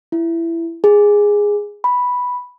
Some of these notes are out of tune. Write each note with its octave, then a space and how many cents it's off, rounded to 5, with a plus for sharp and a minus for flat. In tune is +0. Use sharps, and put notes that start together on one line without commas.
E4 +15
G#4 -10
B5 +0